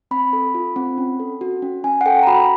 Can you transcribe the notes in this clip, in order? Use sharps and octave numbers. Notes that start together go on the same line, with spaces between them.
C4 B5
A4
F4
C4
C#4
A4
F#4
C#4
C#4 G#5
F#5
A4 G5
A#5
F#4 B5